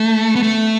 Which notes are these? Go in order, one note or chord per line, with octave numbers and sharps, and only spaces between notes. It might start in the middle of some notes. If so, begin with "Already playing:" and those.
Already playing: A3
B3
A3